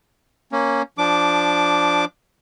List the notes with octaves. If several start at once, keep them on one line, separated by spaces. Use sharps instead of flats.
A#3 C#4
F3 D4 D6